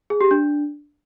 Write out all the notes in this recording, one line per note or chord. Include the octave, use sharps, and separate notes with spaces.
G#4
G4
D4